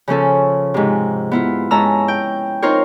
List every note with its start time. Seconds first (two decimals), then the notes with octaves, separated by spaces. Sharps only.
0.08 C#3 F3 C#4 A4
0.74 G#2 C3
1.31 B3 E4 F4
1.71 G#2 C#4 A5 A#5 E6
2.08 G5
2.62 C4 D#4 F4 A#4 C5 C#5